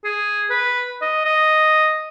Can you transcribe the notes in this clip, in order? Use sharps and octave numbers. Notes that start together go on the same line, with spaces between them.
G#4
B4
D#5
D#5